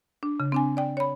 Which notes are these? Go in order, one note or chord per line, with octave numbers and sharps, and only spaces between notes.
D4
C#3
C4 D4 G#5
D5 G5
C#5 B5